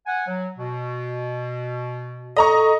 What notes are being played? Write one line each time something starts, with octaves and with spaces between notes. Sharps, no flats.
F#5 G#5
F#3
B2
A4 D#5 A#5 C#6